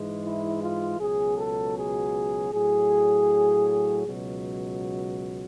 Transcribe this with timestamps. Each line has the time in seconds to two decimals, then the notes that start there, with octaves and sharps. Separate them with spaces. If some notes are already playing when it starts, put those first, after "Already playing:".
Already playing: G#2 E3 G#3
0.22 E4
0.60 F4
0.99 C#2 B2 F#3 G#4
1.37 A4
1.76 G#4
2.52 A2 F#3 G#4
4.06 C#2 B2 F#3